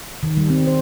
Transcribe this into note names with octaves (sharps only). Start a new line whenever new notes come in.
D#3
G3
C4
C5